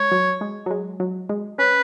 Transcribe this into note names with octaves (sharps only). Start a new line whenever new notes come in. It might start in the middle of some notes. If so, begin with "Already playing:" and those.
Already playing: G#3 C#5
F#3
G#3
F#3
G#3
F#3
G#3
C#4 B4